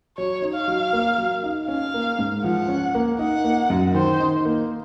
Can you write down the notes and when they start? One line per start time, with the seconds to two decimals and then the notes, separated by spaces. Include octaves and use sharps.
0.18 F#3 C#5
0.42 D#4
0.55 F5
0.68 F#3
0.93 A#3
1.18 F#3
1.43 D#4
1.68 C#4 F5
1.94 A#3
2.19 G#2
2.44 F3 F#5
2.68 C#4
2.95 A#3
3.19 D#4 F#5
3.44 A#3
3.70 F#2
3.94 D#3 C5
4.20 D#4
4.45 A#3